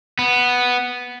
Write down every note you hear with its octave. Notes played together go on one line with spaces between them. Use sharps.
B3